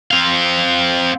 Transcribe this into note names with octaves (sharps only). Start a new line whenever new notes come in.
C4 F5